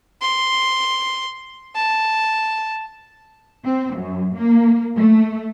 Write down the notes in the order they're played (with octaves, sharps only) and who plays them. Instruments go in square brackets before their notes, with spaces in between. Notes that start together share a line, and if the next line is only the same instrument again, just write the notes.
[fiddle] C6
A5
[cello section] C4
F#2
A#3
A3